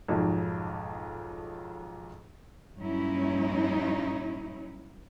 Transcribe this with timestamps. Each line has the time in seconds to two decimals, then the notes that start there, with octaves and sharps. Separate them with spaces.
0.08 B1 F2 G#2
2.77 G2 A#2 F#3 C#4 D#4 E4